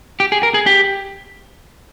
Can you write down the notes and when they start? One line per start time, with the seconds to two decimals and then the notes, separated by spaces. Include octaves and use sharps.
0.20 G4
0.32 G#4
0.43 A#4
0.54 G#4
0.66 G4